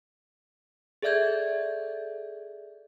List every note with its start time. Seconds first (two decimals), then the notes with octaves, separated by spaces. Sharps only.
1.02 G#4 A4 D5 E5 G6 G#6